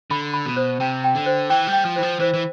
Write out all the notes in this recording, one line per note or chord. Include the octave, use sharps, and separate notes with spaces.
D3 B5
B5
B2
C5
C3 G5
G5
D3
C5
E3 G5
G3
G5
F3
E3 C5
F3
E3 C5
E3